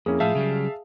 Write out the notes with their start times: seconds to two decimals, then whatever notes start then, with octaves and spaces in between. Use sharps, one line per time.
0.06 F2 A#3 C#4 E4 G#4
0.20 A2 F3 E5 F5 A5
0.35 C#3 F#3 G3